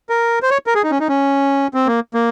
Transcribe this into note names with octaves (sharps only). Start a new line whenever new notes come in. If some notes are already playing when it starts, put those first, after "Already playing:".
A#4
C5
C#5
A#4
G#4
D#4
C#4
D#4
C#4
C4
A#3
A#3